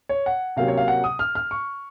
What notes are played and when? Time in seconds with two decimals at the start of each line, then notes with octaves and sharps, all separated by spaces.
0.09 C#5
0.26 F#5
0.57 C3 F#3 A#3 C#4 F5
0.68 C#5
0.77 F5
0.88 F#5
1.04 D#6
1.19 F6
1.35 F6
1.51 C#6